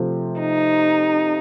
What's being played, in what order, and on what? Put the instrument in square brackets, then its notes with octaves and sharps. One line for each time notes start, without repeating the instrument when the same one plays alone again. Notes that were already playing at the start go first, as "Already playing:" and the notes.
Already playing: [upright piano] C3 F3 A3
[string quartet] D#4